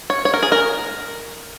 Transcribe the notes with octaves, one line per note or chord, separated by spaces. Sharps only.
C#5
C#5
A#4
G#4
A#4